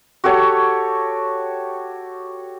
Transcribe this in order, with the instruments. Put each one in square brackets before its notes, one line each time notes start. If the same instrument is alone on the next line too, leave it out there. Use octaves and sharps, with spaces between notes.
[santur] F#4 G4 A4 C#5